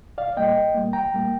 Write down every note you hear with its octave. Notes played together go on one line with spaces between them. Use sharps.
C2 D5 F5
A#2 G3 A#3 D#5 G5
C2
A#2 G3 A#3
C2 G5 A#5
A#2 G3 A#3